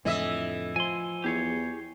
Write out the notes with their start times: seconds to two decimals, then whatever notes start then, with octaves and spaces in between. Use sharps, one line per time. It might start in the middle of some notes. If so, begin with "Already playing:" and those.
0.05 F2 A2 D3 E3 D#5 E5
0.76 F3 G#5 C6
1.24 E2 G4 G#4 C#5